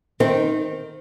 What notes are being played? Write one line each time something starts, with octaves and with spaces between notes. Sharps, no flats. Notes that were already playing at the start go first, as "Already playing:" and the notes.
D#3 C4